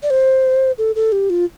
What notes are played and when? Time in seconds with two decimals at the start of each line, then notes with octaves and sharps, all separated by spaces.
0.03 D5
0.10 C5
0.78 A4
0.96 A4
1.12 G4
1.30 F4